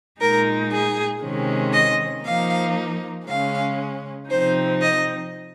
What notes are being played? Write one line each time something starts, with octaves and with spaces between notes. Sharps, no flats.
A#2 G#3 D#4 A#4
G#4
C3 D#3 G#3 C#4
D#5
F3 A#3 D#4 F5
C#3 G#3 C#4 F5
C3 F3 C4 D#4 C5
D#5